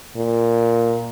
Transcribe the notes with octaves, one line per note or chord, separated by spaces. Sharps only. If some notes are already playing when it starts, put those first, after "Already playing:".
A#2